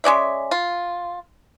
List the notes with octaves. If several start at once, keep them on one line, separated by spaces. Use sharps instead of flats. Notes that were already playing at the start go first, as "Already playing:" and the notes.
G#3 C#4 D5 E5
F4